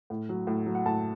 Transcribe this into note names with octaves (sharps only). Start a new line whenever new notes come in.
A2
F#3
A2
F#3
F#5
A2 A5